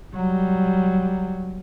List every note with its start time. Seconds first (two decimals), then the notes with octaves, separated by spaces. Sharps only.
0.15 F#3 G3